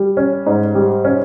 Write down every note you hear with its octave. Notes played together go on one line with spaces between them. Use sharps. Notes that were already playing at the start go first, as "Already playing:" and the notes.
Already playing: G3
C#4
G#2
G3
C#4